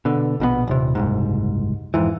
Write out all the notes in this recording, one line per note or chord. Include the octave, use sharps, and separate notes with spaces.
B2 D3
A#1 B2 D#3 B3
D#1 C3
F#1 C2 G#2
F2 G#2 E3